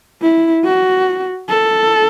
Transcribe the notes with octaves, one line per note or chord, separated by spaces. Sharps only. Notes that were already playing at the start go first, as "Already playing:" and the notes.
E4
F#4
A4